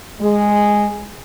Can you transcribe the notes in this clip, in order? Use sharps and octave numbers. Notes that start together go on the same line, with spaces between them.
G#3